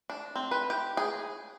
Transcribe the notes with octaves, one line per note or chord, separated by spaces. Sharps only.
D4
C4
B4
G4
G#4